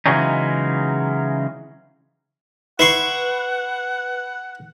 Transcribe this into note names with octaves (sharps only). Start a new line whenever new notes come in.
C#3 E3 F#3 G#3 C#4 D#4
E4 B4 F#5 C6 C#6